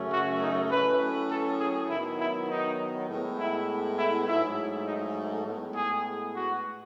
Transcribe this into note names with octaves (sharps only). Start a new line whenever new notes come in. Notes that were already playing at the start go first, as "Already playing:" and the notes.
Already playing: F#2 C#3 F#3 A3 C#4
F#4
D#4
A2 F#3 C#4 B4
A4
G#4
D#3 F#3 B3 E4
E4
D#4
A2 G#3 B3
E4
E4
G#2 F#3 A3 E4
D#4
A2 G#3 B3
G#4
F#4